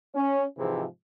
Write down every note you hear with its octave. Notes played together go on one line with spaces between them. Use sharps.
C#4
G#2 C3 E3 F3 G#3